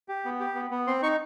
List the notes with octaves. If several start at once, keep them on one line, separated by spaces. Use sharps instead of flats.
G4
B3
G4
B3
B3
C4 C6
D#4 C#6